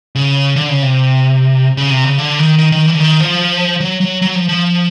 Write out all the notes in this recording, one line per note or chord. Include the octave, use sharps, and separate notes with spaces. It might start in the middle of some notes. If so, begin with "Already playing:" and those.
C#3
D3
C#3
C3
C#3
C3
C#3
D3
D#3
D#3
D#3
E3
D3
D#3
F3
F#3
F#3
F#3
F3
F3